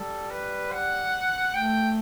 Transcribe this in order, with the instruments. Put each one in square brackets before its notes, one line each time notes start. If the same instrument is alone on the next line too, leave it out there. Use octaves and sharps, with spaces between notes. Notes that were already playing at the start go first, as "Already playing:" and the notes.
Already playing: [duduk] G3 [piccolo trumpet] A4
[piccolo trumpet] B4
F#5
[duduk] A3 [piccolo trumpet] G5